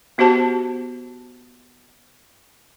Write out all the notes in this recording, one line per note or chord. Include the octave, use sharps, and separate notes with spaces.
B3 F#4 G4 C5 A5